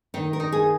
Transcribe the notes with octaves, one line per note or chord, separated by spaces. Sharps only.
D#3 D#4
A#4
D#4
G#4